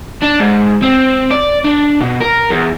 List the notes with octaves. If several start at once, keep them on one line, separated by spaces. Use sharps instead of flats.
D4
G#2
C4
D5
D4
B2
A#4
E2